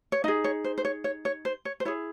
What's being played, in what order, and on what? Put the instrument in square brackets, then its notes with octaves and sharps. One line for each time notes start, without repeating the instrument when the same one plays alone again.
[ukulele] C#5
D#4 D#5
G#4
C#5
C5
C5
C#5
C#5
C#5
C5
C#5
C5
E4 G#4 C#5